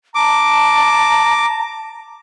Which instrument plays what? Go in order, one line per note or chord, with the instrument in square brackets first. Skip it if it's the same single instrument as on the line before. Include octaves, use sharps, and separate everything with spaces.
[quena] A5 [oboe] A#5 [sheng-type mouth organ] D6